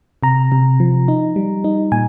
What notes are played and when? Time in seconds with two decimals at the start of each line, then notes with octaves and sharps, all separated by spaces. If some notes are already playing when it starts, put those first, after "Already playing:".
0.23 C3 A#5
0.52 C3
0.80 F3
1.08 D#4
1.36 G3
1.64 D#4
1.92 A#2 G#5